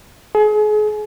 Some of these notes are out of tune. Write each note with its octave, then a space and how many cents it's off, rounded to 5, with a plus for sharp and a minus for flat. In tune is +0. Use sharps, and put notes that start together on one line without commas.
G#4 +35